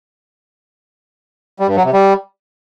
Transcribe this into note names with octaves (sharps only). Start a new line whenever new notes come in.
G3
G2
F#3
C3
G3